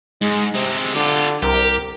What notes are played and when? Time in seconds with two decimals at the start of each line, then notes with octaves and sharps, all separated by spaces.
0.21 G#2 G#3
0.54 C3 G#3 C4
0.95 D3 F4 G4
1.42 C2 G4 A#4